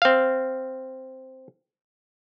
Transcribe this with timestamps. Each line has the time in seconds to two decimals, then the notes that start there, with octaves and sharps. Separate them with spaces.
0.02 C4 F5